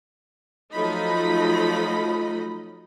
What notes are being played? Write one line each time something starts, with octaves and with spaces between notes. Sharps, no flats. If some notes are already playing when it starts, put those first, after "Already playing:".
F3 F#3 A3 D#4 D#5 B5